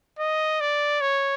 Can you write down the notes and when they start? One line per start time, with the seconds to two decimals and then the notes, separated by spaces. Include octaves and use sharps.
0.19 D#5
0.60 D5
1.01 C#5